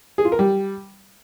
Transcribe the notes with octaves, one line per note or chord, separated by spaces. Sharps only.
G#4
F4
A#4
G3